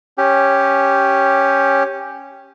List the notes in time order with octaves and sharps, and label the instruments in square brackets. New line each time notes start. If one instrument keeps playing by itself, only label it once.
[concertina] C#4 G4